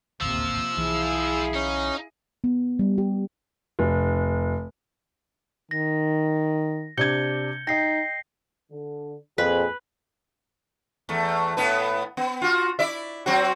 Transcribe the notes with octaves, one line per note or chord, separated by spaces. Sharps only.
D#1 A1 D2 C3 F3 A#3 F4 E6
B1 E3 E4 G#4 F5
C#4 D#4
B3
G3
G4
F1
D#3 A#6
C3 D4 G6 G#6 C#7 G7
D#4 D#5 G5 A#6 C7
D3
F2 A#2 C4 G#4 B4
E2 A3
A2 B3 B4
B3
F4 F#4
E4 D5 E5
F#3 C4 F#4